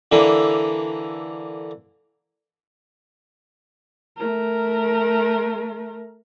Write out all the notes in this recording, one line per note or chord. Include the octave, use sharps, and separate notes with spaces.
D3 E3 A#3
A3 A#4